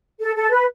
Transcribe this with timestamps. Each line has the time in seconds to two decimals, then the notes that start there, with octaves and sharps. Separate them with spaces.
0.20 A4
0.35 A4
0.50 B4